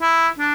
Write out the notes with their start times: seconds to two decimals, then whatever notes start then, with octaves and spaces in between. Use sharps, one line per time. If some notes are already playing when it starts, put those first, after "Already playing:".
0.01 E4
0.38 D4